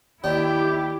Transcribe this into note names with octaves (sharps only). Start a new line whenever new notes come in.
D#2 D4 E4 G4 G5